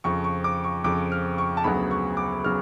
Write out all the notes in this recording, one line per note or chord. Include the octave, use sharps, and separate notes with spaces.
F2 C#3 F3 C#6
C#6
D6
C#6
F2 C#3 F3 D6
F6
C#6
A5
D2 C#3 F#3 B3 B5
C#6
D6
C#3 F#3 B3 F6